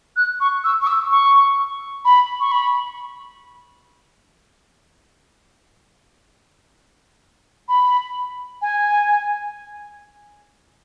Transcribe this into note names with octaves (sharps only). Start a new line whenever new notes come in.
F#6
C#6
E6
C#6
E6
C#6
B5
C#6
B5
B5
G#5